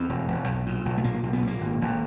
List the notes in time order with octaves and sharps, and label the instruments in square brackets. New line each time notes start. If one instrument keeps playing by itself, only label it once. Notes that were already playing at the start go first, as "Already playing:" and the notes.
Already playing: [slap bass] E2 C4
E1
E1
B1
A#2
B1
A3
A#2 A#3
B1
B3
A#2 A#3
G#1
G#1